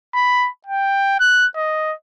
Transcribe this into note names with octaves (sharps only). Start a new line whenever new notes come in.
B5
G5
F#6
D#5